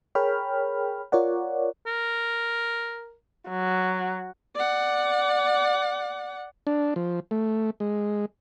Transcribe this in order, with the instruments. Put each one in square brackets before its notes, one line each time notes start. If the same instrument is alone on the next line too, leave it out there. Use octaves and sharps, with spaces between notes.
[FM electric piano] G#4 A#4 C#5 G5 B5 F6
F4 A#4 C#5 D5 F#5
[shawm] A#4
[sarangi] F#3
[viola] D5 F#5
[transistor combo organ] D4
F3
A3
G#3